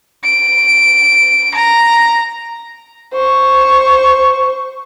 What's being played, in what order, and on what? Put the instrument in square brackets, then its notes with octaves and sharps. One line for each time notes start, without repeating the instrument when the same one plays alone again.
[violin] D7
A#5
[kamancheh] C5 C#6